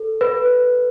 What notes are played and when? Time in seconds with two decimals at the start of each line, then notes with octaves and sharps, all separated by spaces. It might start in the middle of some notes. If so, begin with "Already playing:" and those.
Already playing: A4
0.21 B4